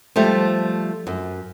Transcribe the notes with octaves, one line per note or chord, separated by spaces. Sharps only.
F3 G3 A3
F#2